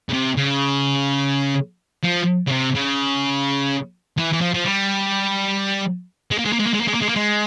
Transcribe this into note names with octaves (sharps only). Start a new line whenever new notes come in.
C#3
C3
C#3
F3
C#3
C3
C#3
E3
E3
F3
F3
G3
G#3
A#3
G#3
A#3
G#3
A#3
G#3
A#3
G#3
A#3
G#3
A#3
G#3